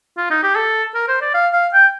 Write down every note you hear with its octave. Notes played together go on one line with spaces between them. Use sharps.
F4
D#4
G4
A4
A#4
C5
D5
F5
F5
G5